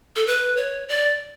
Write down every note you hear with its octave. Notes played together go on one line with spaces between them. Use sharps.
A4
B4
C#5
D5